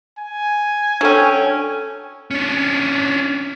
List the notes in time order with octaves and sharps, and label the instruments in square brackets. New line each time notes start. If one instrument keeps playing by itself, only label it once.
[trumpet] G#5
[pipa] F#3 C#4 [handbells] D4 A4 G5
[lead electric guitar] C#4 D4